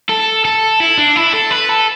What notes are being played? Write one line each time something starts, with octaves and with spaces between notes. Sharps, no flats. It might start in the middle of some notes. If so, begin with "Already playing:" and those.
A4
A4
E4
D4
E4
A4
B4
A4